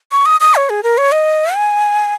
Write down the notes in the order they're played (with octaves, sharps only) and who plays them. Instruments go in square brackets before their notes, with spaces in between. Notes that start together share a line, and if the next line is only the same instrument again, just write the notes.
[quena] C#6
D#6
D#6
C#5
G#4
A#4
C#5
D#5
G#5